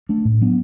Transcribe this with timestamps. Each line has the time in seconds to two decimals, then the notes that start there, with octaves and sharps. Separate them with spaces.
0.09 A3 D4
0.25 A2
0.41 F#3 B3 D4